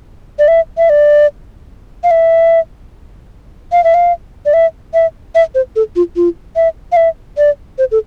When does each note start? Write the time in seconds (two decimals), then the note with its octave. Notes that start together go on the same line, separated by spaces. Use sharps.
0.39 D5
0.48 E5
0.78 E5
0.90 D5
2.04 F5
2.11 E5
3.72 F5
3.84 E5
3.94 F5
4.46 D5
4.54 E5
4.94 E5
5.35 E5
5.55 C5
5.76 A4
5.96 F4
6.16 F4
6.56 E5
6.92 F5
6.96 E5
7.38 D5
7.78 C5
7.91 A4